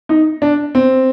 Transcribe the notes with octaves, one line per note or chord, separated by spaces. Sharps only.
D#4
D4
C4